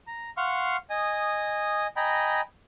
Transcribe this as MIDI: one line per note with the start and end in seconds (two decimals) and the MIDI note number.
0.07 0.30 82
0.37 0.76 77
0.37 0.76 78
0.37 0.76 84
0.37 0.76 85
0.37 0.76 89
0.90 1.87 75
0.90 1.87 80
0.90 1.87 87
1.97 2.41 75
1.97 2.41 79
1.97 2.41 80
1.97 2.41 82
1.97 2.41 83